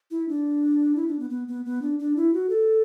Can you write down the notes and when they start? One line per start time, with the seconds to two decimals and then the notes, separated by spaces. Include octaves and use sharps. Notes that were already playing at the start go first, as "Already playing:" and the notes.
0.11 E4
0.29 D4
0.96 E4
1.08 D4
1.19 B3
1.30 B3
1.48 B3
1.65 B3
1.82 D4
1.99 D4
2.16 E4
2.34 F#4
2.50 A4